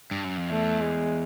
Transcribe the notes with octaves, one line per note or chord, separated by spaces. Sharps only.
G2
F#2
F2
E2 A3
G#3